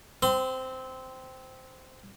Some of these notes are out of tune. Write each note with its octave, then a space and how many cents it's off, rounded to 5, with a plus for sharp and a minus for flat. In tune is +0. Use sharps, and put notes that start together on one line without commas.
C4 -10 C6 -35